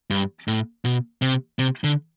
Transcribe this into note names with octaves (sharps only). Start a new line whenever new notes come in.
G2
A2
B2
C3
C3
D3